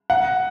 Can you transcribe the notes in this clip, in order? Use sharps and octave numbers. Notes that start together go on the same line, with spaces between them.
F#5